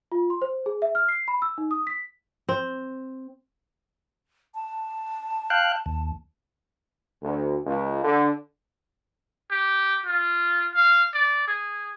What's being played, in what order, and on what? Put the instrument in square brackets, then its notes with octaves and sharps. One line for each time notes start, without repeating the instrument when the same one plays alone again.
[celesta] F4
C6
C5
G#4
E5
F6
C7
B5
E6
D#4
D#6
B6
[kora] C4
[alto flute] A5
[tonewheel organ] F5 G5 F#6
D#2
[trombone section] D2
C#2
D3
[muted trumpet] G4
F4
F5
D5
G#4